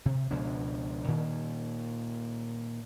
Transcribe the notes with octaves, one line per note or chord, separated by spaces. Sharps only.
C3
C#2 B2 F3 D4
A#2 D#3